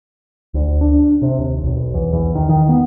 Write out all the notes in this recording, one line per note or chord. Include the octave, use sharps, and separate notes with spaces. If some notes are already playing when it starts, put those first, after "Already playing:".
D2
D4
C3
D#2
B1
E2
E2
D#3
D#3
B3